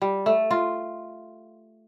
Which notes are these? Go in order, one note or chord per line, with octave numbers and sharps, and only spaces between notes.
G3
A3
F4